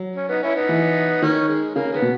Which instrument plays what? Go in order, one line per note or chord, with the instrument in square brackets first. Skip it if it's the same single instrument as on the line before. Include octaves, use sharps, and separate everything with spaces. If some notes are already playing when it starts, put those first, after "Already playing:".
Already playing: [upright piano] F#3
[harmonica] C#4
B3 D#4
C#4 E4
B3 D#4
[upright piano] E3
[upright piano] D#3 [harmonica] C#4
[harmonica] G#3
[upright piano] C#3 [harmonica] A#3
[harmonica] D#3 G#3 B3
[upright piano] B2